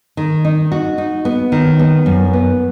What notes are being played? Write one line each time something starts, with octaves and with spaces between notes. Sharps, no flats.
D#3
D#4
F#4
D#4
B3
D#3
B3
F#2
B3